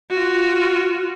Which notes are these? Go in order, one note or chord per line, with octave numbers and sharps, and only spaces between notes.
F4 F#4